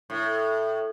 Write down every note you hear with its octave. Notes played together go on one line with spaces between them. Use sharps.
A2